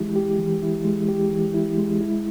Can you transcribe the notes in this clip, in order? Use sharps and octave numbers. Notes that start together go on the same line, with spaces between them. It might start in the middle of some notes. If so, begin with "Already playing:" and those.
Already playing: E3 G#3 E4 G4
G4
E3
E4
G#3
G4
E3
E4
G#3
E4